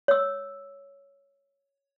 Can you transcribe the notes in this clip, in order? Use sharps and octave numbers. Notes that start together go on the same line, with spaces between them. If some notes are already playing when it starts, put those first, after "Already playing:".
C#5 E6